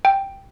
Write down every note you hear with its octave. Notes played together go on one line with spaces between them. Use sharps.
G5